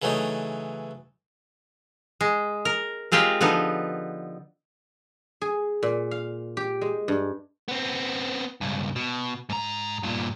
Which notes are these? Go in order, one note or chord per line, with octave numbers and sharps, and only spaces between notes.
C#3 E3 F#3 A3 D#4
G#3
A#4
G#3 C4 F4 G4 A#4
D3 F3 B3 D#4
G#4
A#2
F5
G4
G#3
G2
B3 C4
C#2 G2
B2
G#2 A#5
G2 A#2